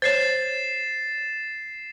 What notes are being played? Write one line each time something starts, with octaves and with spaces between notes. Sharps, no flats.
C5 C#5 A6 C7 E7